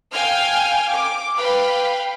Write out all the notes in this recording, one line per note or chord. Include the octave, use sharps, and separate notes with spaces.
F5 G5 G#5 F6 G#6
D6
B4 F5 G5 B5